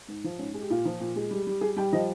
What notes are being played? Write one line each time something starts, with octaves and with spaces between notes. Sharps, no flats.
G#2
F3
G#2 C#4
G#3
G4
A#2 F4
F3
A#2
G#3
G3
G3
G3 G#4
G3 G5
F3 D#5